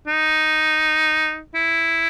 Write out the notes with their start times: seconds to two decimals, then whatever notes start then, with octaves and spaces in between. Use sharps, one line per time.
0.07 D#4
1.54 E4